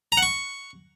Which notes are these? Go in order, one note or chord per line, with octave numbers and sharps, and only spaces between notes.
A#5
F#5
C#6